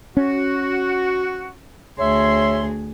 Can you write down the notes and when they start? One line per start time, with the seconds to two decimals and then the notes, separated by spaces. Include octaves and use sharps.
0.17 C#4 F#4
1.98 D2 G#4 C#5 E5 C6